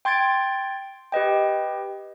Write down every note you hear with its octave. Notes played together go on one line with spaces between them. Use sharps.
G5 C6 G#6 A6 D7
G4 B4 D#5 G5